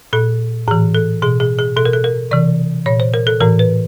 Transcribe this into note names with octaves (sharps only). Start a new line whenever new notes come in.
A#2 A4
A2 E3 G#4
A4
B2 G#4
G#4
G#4
B2 A4
A#4
A4
A#4
C3 E3 D5
A#2 C#5
C5
A#4
A4
A2 E3 A#4
B4